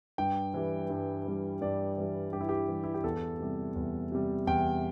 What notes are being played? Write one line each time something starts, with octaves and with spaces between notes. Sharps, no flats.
G2 G5
E3 G3
G2
E3 G3
G2 D5
E3 G3
G2 G4
E4
G4
E3 G3
E4
G4
E2 A4
C3 G3
E2
C3 G3
E2 G5